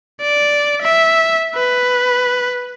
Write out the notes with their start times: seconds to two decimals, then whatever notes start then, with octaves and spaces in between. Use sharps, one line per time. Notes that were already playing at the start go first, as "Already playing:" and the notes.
0.21 D5
0.82 E5
1.55 B4